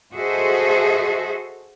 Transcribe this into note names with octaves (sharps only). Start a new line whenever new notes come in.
F#4 G#4 A4 C5 D#5 E5